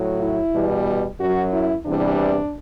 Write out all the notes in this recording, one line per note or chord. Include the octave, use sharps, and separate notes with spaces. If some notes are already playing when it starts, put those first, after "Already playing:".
Already playing: A2 F#3
E4
E2 B2 G3
F#2 F#3 F#4
E4
E2 C3 E3 G3 D4